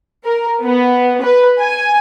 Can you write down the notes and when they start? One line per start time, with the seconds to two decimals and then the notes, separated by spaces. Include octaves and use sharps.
0.24 A#4
0.62 B3
1.22 B4
1.59 G#5